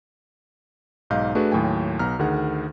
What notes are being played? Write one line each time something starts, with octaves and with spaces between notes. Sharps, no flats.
B1 G#2 D#5 F5 G6
A3 D4 F#4 G#4 B4
D#2 A2 F#3 G5 G#5
B1 B3 A#5 F6
D2 D#3 G#4 F#5